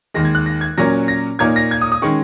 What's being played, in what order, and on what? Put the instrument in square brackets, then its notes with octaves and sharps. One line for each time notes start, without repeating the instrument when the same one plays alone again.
[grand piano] D#2 D#3 G#3 [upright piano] A#6
[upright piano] G#6
F#6
A#6
G#6
[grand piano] A#2 F#3 C#4 A#4 C#5 [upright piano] A#6
[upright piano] A#6
[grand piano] A#2 A#3 D#4 A#4 C#5 [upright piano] G#6
[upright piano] A#6
G#6
D#6
D#6
[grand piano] D#3 G#3 C#4 [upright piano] C#6